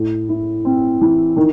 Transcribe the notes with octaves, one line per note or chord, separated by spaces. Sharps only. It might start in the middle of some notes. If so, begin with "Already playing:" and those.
Already playing: A2
E4
C4
E3
D#3